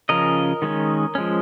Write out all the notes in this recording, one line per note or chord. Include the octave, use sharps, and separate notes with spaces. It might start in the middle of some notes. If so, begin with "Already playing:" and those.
C#3 F3 C#4 A#4 D#5
D#3 G#3 C#4
F3 G#3 C#4